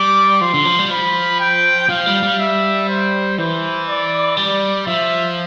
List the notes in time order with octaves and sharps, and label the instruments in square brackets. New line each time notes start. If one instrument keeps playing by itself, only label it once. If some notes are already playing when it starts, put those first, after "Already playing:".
Already playing: [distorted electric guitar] G3 [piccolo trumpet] D6
[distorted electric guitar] F3 [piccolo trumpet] C6
[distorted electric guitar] D3
F3
G3
[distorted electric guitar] F3 [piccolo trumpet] B5
[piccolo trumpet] G5
[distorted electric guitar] F3 [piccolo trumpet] F5
[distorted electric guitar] G3
G3
[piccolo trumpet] E5
C5
[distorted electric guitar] E3 [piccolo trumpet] C5
[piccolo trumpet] D5
[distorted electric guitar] G3 [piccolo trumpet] D5
[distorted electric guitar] F3 [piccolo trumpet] E5